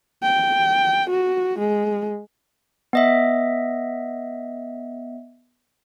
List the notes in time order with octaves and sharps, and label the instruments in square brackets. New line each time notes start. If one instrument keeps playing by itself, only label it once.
[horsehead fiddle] G5
F#4
G#3
[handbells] B3 D#5 E5